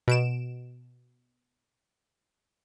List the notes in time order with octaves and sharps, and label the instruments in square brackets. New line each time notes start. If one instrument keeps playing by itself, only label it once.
[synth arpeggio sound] B2 D7 E7